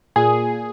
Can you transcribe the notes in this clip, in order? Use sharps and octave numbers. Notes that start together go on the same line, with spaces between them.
A#2 G#4